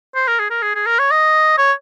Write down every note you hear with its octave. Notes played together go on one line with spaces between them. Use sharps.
C5
A#4
G#4
A#4
G#4
G#4
A#4
C#5
D#5
C#5